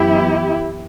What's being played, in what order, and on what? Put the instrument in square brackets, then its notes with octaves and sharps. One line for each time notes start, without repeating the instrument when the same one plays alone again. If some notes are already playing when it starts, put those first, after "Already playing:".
Already playing: [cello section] F#2 E3 B3 E4 G4